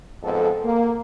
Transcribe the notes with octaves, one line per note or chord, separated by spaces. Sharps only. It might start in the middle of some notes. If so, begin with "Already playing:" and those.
F2 G#2 B3 A4
A#3